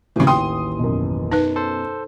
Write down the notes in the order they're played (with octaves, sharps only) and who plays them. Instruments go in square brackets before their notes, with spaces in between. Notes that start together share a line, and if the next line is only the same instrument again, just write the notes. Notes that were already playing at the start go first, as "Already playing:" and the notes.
[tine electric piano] A1 D#2 E3 [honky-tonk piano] A2 C#3 [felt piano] F#4
[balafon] G5 [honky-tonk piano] C6 D#6
[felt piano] F#2 B2
[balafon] D#4 B4
[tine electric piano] A4 C5